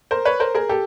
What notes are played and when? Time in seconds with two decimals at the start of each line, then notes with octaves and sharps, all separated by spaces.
0.11 A#4 C5
0.25 B4 C#5
0.40 A#4 C5
0.55 G#4 A#4
0.69 G4 A4